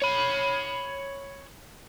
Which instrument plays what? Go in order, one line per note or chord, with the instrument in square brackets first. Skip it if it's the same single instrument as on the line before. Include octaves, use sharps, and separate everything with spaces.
[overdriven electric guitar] C#5 B5